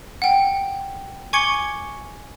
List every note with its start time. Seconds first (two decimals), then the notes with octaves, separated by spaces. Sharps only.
0.22 F#5 G5
1.33 G#5 C#6 D6 G#6 C#7 G7